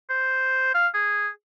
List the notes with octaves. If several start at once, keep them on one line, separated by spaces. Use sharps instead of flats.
C5
F5
G#4